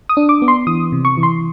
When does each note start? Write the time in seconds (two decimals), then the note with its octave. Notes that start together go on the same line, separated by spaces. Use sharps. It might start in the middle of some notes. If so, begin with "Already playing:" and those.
0.09 D#6
0.17 D4
0.29 D6
0.42 B3
0.48 C6
0.67 E3 D#6
0.92 C3
1.05 C#6
1.17 E3
1.23 C6